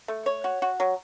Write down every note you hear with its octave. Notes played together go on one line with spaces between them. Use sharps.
A3
C#5
F#4
F#4
F#3